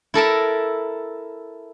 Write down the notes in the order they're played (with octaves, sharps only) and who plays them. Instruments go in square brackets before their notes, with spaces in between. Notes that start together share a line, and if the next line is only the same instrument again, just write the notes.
[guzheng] E4 A4 A#4 E5